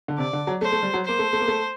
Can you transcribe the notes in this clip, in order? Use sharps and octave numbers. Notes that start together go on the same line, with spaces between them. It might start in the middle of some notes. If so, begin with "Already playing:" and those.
D3
C3 D5
D3
F#3
A3 C5
A3
G3
F#3
A#3 C5
A3
A3
A#3
A3